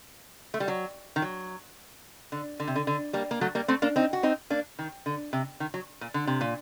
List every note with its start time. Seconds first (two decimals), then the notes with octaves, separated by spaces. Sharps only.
0.54 A3
0.60 G3
0.68 F#3
1.16 D#3
1.22 F#3
2.32 D3
2.60 D3
2.67 C3
2.76 D3
2.87 D3
3.13 G3 A#3
3.31 A#3
3.41 F#3 A3
3.55 G3 A#3
3.68 A3 C4
3.82 A#3 D4
3.96 C4 D#4
4.13 F#4
4.23 C4 D#4
4.50 A#3 D4
4.79 D#3
5.06 D3
5.33 C3
5.60 D#3
5.74 F#3
6.01 A#2
6.14 D3
6.27 C3
6.41 A#2